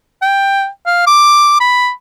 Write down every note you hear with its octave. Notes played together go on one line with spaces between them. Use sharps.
G5
F5
D6
B5